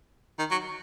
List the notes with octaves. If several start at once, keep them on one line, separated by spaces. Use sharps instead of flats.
D#3
F#3